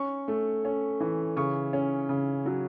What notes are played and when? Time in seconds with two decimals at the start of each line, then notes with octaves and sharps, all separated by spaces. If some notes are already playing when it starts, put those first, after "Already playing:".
Already playing: C#4 C#6
0.28 A3
0.65 C#4
1.00 E3
1.36 C#3 C#6
1.73 C#4
2.09 C#3
2.46 F#3